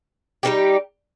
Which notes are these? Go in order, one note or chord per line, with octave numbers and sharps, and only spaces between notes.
G3 A#3 D#4 G4